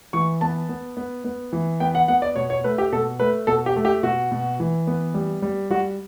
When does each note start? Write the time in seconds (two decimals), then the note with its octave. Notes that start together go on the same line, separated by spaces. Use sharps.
0.13 E3 C#6
0.41 B3 A5
0.69 B3
0.97 B3
1.24 B3
1.53 E3
1.80 B3 G5
1.95 F#5
2.08 B3 F#5
2.22 D5
2.36 B2 C#5
2.50 C#5
2.64 A3 B4
2.78 G4
2.92 B2 A4
3.20 A3 B4
3.47 B2 A4
3.66 G4
3.76 A3
3.85 G4
4.03 B2 F#4
4.31 B2
4.60 E3
4.87 B3
5.14 G3
5.42 G3
5.70 G3 F#4